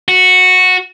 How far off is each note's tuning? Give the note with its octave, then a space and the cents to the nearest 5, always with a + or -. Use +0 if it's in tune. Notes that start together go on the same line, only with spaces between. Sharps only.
F#4 -10